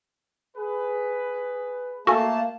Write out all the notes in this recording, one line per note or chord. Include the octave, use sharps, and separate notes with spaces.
G#4 B4
A3 A#3 F#4 A4 F5 G#5 A5